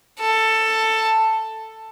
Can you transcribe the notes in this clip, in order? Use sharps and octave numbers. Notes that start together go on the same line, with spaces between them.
A4